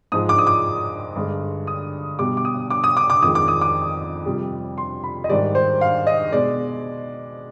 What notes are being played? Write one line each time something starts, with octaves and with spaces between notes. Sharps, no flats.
G#2 F3 G#3 D#6
D6
D#6
D6
G2 D3 G#3
D#6
B2 G3 D6
D6
D#6
D6
D#6
D6
D6
F2 D#3 G#3 D#6
D6
D#6
D6
F2 C3 G3
C6
B5
D#5
G#2 D#3 G3 D5
C5
F5
D#5
B2 G#3 D5